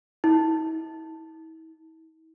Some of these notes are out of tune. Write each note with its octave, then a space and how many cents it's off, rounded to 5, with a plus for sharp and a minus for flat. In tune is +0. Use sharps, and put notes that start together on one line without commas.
E4 -40